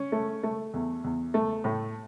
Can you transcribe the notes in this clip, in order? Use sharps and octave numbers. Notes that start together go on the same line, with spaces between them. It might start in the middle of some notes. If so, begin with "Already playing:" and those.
Already playing: C#4
A3
A3
E2
E2
A3
A2